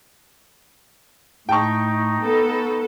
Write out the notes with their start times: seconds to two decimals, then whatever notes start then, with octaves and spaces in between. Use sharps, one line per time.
1.49 A2 D#4 G5 A5 C#6
2.23 B3 A4